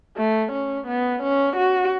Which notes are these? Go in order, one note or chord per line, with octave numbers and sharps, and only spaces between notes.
A3
C#4
B3
C#4
F#4